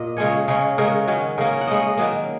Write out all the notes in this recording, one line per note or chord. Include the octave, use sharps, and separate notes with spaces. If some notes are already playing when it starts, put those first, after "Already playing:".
Already playing: A#2 D#5
C#3 G#3 C#4 C#5
C#3 G#3 C#4
C#3 G#3 C#4 A#4
D#3 F#3 C#4
C#3 A#3 C#4 A#4
F#5
C#3 G#3 C#4 D#5
D#5
D#3 F#3 A#3